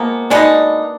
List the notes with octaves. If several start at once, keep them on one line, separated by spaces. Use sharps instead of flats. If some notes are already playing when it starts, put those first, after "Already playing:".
Already playing: F3 G#3 A#3 B3
B2 G#3 B3 D4 D#4